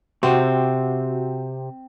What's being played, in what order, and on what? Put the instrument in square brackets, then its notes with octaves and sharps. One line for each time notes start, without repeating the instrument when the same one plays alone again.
[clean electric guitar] C3 [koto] C4 [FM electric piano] F#4